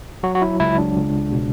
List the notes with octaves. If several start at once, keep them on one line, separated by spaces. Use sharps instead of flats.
F#3 F#4
F#4
E4
C#2 E4
D4
C#2
B2